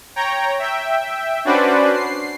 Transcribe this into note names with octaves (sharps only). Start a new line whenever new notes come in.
C#5 G5 A#5
E5 G5
C#4 D4 F#4 B4 C5 D5
C7